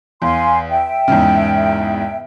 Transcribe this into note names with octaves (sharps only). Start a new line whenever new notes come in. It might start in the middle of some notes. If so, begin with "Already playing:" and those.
E2 F5 G#5 C6
E5 G5
E2 G#2 C#3